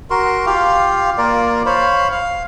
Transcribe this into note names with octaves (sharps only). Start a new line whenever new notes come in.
F#4 A#4 C6
F4 G4 F5
A#3 F4 A#4 D5
C5 C#5 F5 B5
F5